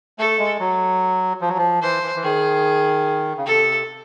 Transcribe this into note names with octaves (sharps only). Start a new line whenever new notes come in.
A3 A4
G#3
F#3
F3
F#3
F3
E3 C5
E3
E3
D#3 G#4
C#3
C3 A4